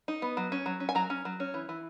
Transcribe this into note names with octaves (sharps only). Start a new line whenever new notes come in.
D#4
B3
F#3
C#4
F#3
C#4
G#5
F#3 A#5
C#4
F#3
C#4
E3
E3